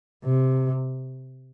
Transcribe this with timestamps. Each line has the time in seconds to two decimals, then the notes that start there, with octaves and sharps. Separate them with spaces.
0.25 C3